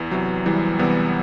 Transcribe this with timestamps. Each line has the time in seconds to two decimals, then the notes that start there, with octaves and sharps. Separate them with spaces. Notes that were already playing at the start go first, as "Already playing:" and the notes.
Already playing: E2 E3
0.11 C3 E3 F#3
0.46 E2 E3 G3
0.79 C3 E3 G3 B3